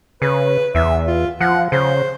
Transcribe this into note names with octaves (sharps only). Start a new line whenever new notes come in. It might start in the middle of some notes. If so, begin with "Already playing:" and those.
C#3 B4
E2 E5
F4
F3 F#5
C#3 C5